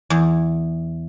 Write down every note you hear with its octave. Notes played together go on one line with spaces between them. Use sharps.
E2